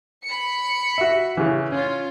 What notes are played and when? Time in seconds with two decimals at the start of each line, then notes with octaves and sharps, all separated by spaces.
0.24 B5 C#7
0.98 F#4 E5
1.37 C#3 E3
1.72 C#4 F4